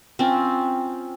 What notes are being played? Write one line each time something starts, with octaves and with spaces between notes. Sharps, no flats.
C4 C#4 F4